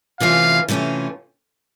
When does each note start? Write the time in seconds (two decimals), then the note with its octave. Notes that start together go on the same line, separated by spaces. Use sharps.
0.20 C3 E3 A3 C#4 F4 F5
0.68 C3 E3 A3 C#4 F4